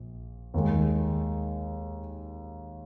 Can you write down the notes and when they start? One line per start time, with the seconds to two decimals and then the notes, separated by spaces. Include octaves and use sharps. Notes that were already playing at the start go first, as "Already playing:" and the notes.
Already playing: A#1
0.54 D#2 D#3 G#3